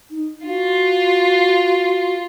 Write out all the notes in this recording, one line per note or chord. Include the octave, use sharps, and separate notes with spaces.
D#4
F4 F#4